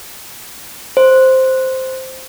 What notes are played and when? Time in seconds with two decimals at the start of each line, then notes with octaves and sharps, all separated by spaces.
0.97 C5